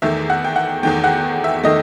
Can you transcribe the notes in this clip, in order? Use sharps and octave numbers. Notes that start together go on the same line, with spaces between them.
E2 D#3 A3 E5
F#5
G5
F#5
E2 D#3 A3 G5
F#5
E5
D#3 A3 D#5